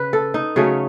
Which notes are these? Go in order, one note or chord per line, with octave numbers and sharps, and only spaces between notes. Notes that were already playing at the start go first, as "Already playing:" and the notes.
Already playing: C#3 B4
A4
D#4
C#3 F#3 A3 C#4